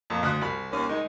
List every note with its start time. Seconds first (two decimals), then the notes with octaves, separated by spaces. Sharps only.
0.10 F2 A#2
0.23 D2 D#6 F#6
0.42 C2 B5
0.71 D#2 C#4
0.89 D#3 G#3 D#4